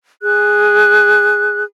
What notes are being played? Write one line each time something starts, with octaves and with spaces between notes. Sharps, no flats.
G#4 F#6